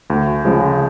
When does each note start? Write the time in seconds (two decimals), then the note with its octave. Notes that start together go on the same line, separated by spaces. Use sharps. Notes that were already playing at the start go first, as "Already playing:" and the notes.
0.10 D2
0.45 C#3 F3 G#3